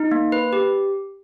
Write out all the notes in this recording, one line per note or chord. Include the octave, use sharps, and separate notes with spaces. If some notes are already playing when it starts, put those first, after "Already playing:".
Already playing: D#4
A#3
B4
G4